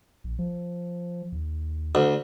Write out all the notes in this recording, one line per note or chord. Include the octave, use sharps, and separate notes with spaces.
A#1
F3
D#2
D2